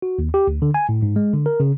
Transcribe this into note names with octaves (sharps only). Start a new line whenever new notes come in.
F#4
D#2
G4
D2
D3
G#5
A2
G#2
G#3
D3
A#4
C#3